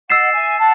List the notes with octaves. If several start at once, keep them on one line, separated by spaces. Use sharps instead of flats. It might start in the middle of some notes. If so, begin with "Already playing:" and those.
D#5 F#5 E6 A6 C7 E7
E5 G#5
F#5 A5